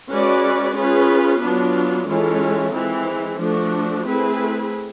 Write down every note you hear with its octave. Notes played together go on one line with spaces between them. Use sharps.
G#3 C#4 F#4 B4 D5
C#4 F4 G#4 B4
F#3 B3 D4 F4
E3 G#3 C#4 F4 A4
E3 G#3 C4
F3 A3 D4 F#4
A3 C4 E4 G#4 B4